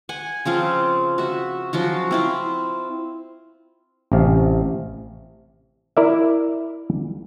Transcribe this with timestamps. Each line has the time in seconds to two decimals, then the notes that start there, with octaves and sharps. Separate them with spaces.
0.09 F#5 G#5
0.45 C#3 F3 C4 F4
1.18 F#4 E5
1.73 C#3 F3 F#3 F#4
2.11 C4 E4 F4
4.12 A1 C3 F5
5.97 E4 A#4 D5 E5